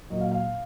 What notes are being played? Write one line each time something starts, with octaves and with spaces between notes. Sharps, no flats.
A#2 F#3 D#5
F5
F5